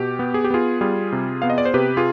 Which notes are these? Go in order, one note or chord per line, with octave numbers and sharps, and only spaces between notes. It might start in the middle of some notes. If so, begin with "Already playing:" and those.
Already playing: B2 G4
B3
G#4
G4
B3 F4 G#4
G3 F4 G#4
C3
B3 F5
D#5
D5
C5
C3 G4 B4
F4 G#4